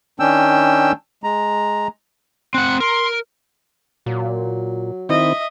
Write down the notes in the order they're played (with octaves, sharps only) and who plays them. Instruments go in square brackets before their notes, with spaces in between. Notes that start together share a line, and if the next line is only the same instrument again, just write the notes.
[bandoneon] D#3 C#4 D4 G5 E6
G#3 A#5
[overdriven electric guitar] C4 F#5 [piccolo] F#6
[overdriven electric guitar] A#4 [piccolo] C6
[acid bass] A#2 [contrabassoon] F#3
[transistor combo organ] D#3 C4 E4 [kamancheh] D#5 E5